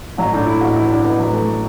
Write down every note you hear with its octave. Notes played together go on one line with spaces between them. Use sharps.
A1 F#3
A2 D4
A2 E4
A1 F#4
E3 E4
A1 D4
A1 B3
A2 F#3
E3 A3